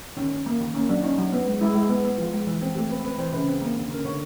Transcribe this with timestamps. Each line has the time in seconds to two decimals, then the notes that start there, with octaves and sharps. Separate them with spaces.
0.17 D#3 C#4
0.31 C#4
0.46 A#3
0.61 D#3
0.74 A#3 C#4
0.89 F#3 D4
1.03 C#4 D#4
1.18 F#3
1.33 B3
1.46 G#3
1.61 G#3 E4
1.75 G#3 E4
1.90 B3
2.04 B3
2.18 F3 F4
2.33 G#3
2.47 E3
2.62 C4
2.75 A3 G4
2.90 C4 B4
3.04 C4 B4
3.18 E3 C5
3.32 C#3 B4
3.48 C4
3.61 A#3
3.76 D3
3.90 C#4 A#4
4.05 D3 C#5